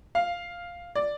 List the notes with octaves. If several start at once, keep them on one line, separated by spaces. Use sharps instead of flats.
F5
D5